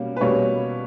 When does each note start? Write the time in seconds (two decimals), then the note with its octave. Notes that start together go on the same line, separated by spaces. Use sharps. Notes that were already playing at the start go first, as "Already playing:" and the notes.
Already playing: B2 G3 A#3 C#4
0.16 B4
0.21 B2 G3 A#3 C#4 C#5